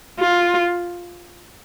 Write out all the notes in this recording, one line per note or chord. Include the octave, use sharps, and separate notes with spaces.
F4